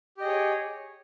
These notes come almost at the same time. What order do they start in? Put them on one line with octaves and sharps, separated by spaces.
G4 D#5 G#4 C#5